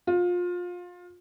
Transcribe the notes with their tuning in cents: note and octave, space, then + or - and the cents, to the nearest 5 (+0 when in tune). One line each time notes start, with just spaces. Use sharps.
F4 +25